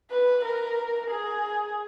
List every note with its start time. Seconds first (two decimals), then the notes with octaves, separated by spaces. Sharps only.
0.11 B4
0.44 A#4
1.11 G#4